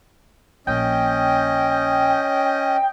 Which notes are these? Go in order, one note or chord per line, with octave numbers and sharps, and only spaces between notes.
A#1 A#3 C#4 D#5 G5